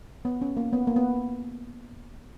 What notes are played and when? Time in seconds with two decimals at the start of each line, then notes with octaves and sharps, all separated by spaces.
0.25 B3
0.42 C#4
0.57 A#3
0.73 B3
0.87 A#3
0.96 B3